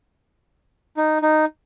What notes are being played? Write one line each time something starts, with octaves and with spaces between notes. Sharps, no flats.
D#4
D#4